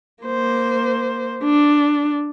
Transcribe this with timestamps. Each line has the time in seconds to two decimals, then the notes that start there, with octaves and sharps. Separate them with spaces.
0.24 A#3 C5
1.43 D4